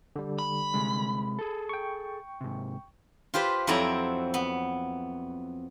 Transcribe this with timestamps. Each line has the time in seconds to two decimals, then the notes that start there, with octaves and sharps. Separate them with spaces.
0.16 D3 G3
0.39 B5
0.74 C3 G#3
1.39 G#4 A4
1.69 G5 C#6
2.41 G#2 C3
3.34 F4 G4 B4 C5
3.67 F2 F#3 C4 E4 D5 A#5
4.34 B3